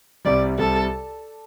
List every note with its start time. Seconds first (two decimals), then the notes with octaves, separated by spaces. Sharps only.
0.25 C2 C3 G3 D5
0.58 C2 C3 G3 A4